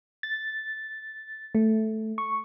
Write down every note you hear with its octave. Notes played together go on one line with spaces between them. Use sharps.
A6
A3
C#6